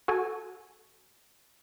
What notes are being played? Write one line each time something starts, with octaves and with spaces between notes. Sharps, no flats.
F#4 A4 G#5